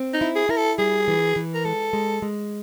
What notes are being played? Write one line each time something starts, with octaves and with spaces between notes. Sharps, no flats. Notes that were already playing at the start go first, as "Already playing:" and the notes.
Already playing: C4
D#4
E4
G#4
E4 A#4
A4
G3 G#4
E3
E3
A#4
G#3 A4
G#3
G#3